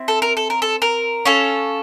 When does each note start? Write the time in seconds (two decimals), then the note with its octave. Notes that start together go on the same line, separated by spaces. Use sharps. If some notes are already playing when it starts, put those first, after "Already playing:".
Already playing: C4 E4
0.08 A4
0.22 A#4
0.37 A4
0.50 A#4
0.62 A4
0.82 A#4
1.25 C#4 F4 A4